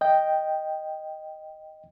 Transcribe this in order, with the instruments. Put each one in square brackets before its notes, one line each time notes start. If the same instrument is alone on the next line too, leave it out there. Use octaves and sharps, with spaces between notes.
[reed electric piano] D#5 G5